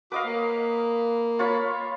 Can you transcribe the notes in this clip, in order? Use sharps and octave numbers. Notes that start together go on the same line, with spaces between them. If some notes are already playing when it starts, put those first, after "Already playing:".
F#4 B4 D#5 F5 D6
A#3
F4 C#5 B5